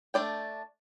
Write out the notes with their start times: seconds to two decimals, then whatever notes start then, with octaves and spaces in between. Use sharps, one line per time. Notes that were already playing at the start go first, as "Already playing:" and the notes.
0.14 A3 D4 D5 G5